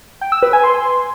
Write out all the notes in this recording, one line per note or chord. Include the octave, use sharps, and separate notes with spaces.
G5
E6
B4
G#5
C6